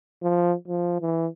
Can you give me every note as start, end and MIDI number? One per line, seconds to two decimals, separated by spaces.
0.23 0.54 53
0.68 0.98 53
1.01 1.27 52